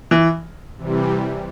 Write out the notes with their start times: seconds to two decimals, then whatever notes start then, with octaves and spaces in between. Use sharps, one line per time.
0.11 E3
0.77 C3 E3 G3